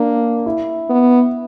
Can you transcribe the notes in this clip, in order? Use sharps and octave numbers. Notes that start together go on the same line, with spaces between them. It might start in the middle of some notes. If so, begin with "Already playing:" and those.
Already playing: A#3 D4
E4
B3